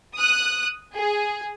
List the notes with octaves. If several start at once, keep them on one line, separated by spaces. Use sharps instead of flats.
D#6 F#6
G#4